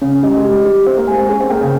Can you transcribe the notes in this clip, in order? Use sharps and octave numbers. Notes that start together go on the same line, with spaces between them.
C#3 C#4
G3 D#5
G#3
G3 G4
G3 G4
C4 G4
A#3
G#3 G#5
C4
C#4 G#4
C4
A#3 G5
C#3